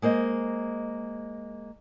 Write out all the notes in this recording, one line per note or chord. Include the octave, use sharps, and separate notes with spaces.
G#3 A#3 C5 D#5